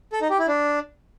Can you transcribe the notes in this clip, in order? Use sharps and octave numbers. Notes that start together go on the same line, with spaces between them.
A4
D#4
G4
E4
D4